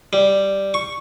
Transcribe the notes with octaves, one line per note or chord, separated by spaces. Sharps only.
G3
C#6